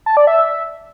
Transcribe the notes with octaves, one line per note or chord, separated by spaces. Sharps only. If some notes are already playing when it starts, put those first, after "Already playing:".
A5
D5
E5